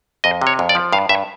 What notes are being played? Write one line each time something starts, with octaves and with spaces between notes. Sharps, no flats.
F2 D#5
C3
C#5
F2
D5
F3
G2 F5
G2 E5